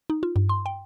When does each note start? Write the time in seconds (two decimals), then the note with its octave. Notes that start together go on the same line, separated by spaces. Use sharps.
0.10 D#4
0.23 F4
0.36 G2
0.49 C6
0.66 G5